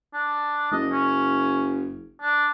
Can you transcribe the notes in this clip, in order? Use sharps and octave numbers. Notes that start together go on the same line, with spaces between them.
D4
F#1 D#5
C#4
D4